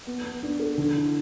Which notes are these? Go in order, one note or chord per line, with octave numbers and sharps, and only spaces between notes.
B3
B3
D4
A4
D3
E4